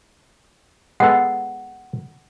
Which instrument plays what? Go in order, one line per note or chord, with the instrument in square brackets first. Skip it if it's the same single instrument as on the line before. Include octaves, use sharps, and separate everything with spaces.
[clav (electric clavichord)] G#3 B3 A4 [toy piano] F#5